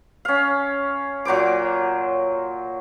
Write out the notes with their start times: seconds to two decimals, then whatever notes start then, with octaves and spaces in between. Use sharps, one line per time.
0.25 C#4 F5
1.25 A#2 F#3 C5 D6